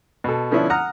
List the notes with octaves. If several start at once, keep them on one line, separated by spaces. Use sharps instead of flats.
B2 A4
D3 F3 B3 C#4 D4 E4
F#5 A#5 D#6 F6